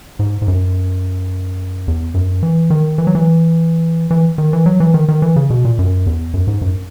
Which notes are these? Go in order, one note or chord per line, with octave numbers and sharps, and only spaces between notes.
G#2
G#2
F#2
E2
F#2
E3
D#3
E3
F#3
E3
E3
D#3
E3
F#3
E3
D#3
D#3
E3
C#3
B2
A#2
F#2
E2
F#2
G#2
F#2